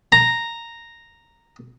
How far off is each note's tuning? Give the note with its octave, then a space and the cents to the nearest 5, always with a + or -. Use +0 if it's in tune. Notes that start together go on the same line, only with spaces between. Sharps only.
A#5 -5